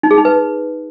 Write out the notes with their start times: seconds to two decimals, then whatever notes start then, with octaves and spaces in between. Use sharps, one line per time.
0.03 D#4
0.11 G#4
0.18 D#4
0.25 B4